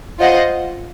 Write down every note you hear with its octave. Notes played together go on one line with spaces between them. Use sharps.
F4 C5 D#5 F#5